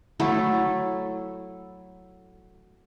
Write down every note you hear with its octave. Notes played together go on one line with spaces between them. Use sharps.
F#3 A3 E4 A4